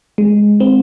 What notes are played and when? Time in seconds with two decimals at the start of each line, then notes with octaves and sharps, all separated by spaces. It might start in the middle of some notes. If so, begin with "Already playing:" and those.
0.18 G#3
0.60 C4